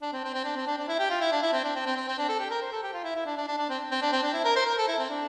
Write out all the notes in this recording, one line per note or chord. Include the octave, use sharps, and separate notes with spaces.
D4
C4
C4
C4
D4
C4
D4
D4
E4
G4
F4
E4
D4
E4
C4
D4
C4
C4
C4
C4
D4
A4
G4
A#4
C5
A4
G4
F4
E4
E4
D4
D4
D4
D4
C4
C4
D4
C4
D4
E4
A#4
C5
A#4
A4
E4
C4
D4